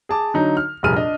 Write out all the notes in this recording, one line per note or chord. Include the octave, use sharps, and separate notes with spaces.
G#4 A5 D6
D3 F#3 D#4
F6
F1 A#1 G3 G#4 F6 D#7
D4 D#5